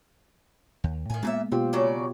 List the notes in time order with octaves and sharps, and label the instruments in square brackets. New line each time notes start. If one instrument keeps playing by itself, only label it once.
[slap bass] D#2
[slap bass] A2 [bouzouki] D#3 G#4
[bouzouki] A#2 G#4 E5 [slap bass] G#3 A#3 B3
[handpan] B2 F4 G4 [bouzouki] C4
[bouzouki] C#3 F#3 D5